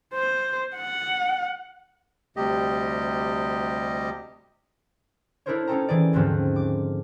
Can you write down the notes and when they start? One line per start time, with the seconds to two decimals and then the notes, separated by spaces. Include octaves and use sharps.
0.14 C5
0.76 F#5
2.37 D2 C3 G3 G4 D#5
5.46 D4 E4 A4 A#4 C5 C#5
5.67 C#4 D#4 F4 A4 G5 A#5
5.89 E3 G#4 D5
6.13 D#2 G#2 D3 F3 C4 C#4
6.56 D6